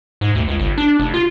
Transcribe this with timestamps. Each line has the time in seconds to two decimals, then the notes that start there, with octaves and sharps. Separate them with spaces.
0.21 G#2
0.35 D2
0.48 C#2
0.59 G1
0.78 D4
1.00 F1
1.14 F4